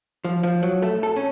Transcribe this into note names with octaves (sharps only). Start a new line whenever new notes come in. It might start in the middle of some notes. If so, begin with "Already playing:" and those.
F3
F3
F#3
A3
A4
C#4